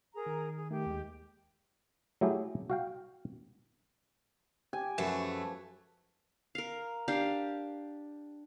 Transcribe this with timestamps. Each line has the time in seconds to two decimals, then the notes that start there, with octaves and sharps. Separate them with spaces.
0.15 G#4 A#4 A#5
0.26 D#3
0.56 G#4
0.71 D#3 A3 G4
0.86 D#2 G#3
2.21 F#3 A3 E4 G4 G#4
2.70 F#4 F5 G5
4.73 G4 G#5
4.98 F#2 F3 A3 F#4 B4
6.55 A#4 F5
7.08 D4 G4 F5